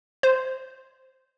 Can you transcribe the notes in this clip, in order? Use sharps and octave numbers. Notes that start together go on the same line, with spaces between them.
C5